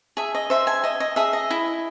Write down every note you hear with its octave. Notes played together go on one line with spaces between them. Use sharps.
G#4 E5
D#5
C5 E5
G#5
D#5 E5
D#5
G#4 E5
D#5
E4